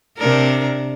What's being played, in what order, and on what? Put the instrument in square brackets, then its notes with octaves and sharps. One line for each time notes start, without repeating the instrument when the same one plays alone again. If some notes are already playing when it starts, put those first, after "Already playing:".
[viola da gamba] C3 D4 A#4